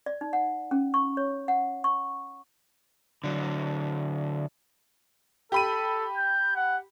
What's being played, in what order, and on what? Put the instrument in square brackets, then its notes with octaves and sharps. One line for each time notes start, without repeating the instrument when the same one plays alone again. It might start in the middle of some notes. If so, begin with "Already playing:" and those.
[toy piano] D5
D#4
F#5
C#4
C#6
C#5
F#5
C#6
[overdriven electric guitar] D3 F#3
[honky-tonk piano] G4 B5 D#7 [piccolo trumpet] A4
[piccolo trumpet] G6
F#5